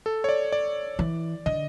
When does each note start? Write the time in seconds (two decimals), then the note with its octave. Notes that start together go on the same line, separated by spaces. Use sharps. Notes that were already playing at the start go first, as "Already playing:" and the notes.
0.06 A4
0.24 C#5
0.29 D5
0.52 D5
0.99 E3
1.46 D3 D#5